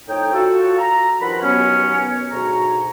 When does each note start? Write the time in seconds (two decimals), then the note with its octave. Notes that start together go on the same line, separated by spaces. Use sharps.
0.08 F2 A2 D#4 C#5 D#5 G5
0.33 F4 F#4 A4
0.78 A#5
1.21 G2 D#3 F3 F4 F#5 B5
1.41 D#2 B2 F#3 B3 C#4
2.31 D2 G#2 B2 F#4 C#5 A#5